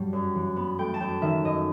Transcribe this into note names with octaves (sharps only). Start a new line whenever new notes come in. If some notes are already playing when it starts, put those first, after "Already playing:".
Already playing: G2 F#3 G3 C4
F#2
E3
B3
A3 G5
A5
F#2 G5
D#3 E5
F#2 D#5